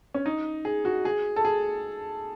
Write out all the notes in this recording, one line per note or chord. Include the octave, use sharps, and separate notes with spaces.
C#4
D#4
G#4
F#4
G#4
A4
G#4